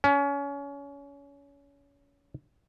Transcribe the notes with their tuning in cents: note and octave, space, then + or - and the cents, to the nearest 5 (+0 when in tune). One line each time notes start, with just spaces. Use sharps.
C#4 +25